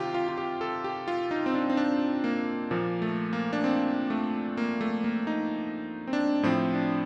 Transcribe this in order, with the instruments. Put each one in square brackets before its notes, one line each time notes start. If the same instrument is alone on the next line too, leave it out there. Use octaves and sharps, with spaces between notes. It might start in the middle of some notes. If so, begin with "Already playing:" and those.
Already playing: [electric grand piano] C3 D#3 F4 G4
F4
F4
G4
A4
G4
F4
D#4
C4
D4
C4
D4
A#3
A#2 F3 A#3
A3
A#3
D4
C4
A3
A#3
A3
A#3
D#4
C4
D4
A2 F3 C4
D4